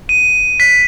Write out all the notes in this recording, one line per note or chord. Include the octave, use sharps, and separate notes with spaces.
D#7
B6